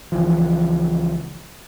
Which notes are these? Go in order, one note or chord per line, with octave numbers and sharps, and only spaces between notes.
C#2 E3 F3